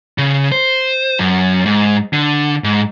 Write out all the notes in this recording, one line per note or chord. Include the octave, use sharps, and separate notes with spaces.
C#3
C5
F#2
G#2
D3
G#2